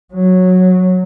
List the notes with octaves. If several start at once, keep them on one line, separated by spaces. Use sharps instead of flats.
F#3